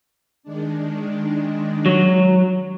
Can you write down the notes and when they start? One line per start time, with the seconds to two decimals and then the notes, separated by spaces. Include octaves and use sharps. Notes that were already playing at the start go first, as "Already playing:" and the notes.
0.43 D#3 G#3 D4
1.86 F#3